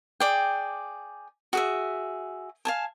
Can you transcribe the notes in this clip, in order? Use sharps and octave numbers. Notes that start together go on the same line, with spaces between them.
G#4 D5 G5
F#4 G#4 E5
F5 G#5 A5